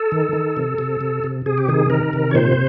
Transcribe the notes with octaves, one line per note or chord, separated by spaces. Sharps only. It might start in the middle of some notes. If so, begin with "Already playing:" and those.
Already playing: A4
D#3
D#3
C3
C3
C3
C3
C3 G#4
G4
D#3 G#4
D#3 A#4
C3
C#5
A#2 C5